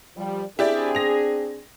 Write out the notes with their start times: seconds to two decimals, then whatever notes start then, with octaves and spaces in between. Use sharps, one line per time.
0.16 F3 G3
0.59 C4 D4 E4 G4 G#4 D5
0.95 A#6 F7